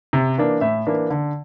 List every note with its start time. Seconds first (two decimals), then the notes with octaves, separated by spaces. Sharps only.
0.13 C3
0.38 E3 A#3 D4
0.61 A2 E5
0.87 E3 A#3 D4
1.10 D3